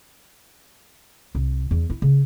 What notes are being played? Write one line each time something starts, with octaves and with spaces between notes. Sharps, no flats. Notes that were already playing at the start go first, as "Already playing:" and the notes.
C2
E2
E4
C#3